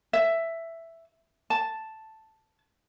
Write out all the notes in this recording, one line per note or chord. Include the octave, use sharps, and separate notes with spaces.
E5
A5